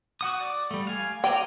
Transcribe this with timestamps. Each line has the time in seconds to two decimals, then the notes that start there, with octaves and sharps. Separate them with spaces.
0.21 F#4 F#5 D#6
0.40 D5
0.71 G3 A3
0.87 F5 G#5
1.24 D5 D#5 G5 A#5